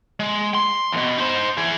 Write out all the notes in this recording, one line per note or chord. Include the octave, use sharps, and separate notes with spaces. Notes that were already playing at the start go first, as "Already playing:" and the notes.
G#3
C6
E2 B2
D#4 C5
E3 G#4